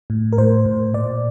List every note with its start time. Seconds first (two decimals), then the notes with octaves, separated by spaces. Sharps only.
0.10 A2
0.33 A#4
0.38 A2 C5
0.66 A2
0.94 A#2 D5